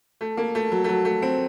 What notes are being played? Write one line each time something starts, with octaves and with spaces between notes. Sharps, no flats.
A3
A#3
A3
F#3
A3
F#3
A3
C4